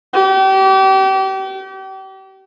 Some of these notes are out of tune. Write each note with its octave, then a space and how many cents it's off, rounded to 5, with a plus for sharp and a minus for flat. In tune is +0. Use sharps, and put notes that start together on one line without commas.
G4 -35